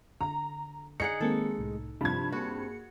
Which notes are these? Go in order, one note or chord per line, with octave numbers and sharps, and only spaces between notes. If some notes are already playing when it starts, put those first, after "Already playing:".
D3 A#5
D#4 G#4 F#5 C#7
D#3 G#3 A#3 C4 A4
C2 A2
G2 C3 F3 A5 B5 G#6
A#3 C4 F#4 G#4 C#7